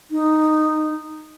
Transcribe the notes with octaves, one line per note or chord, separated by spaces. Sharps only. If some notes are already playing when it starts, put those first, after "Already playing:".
D#4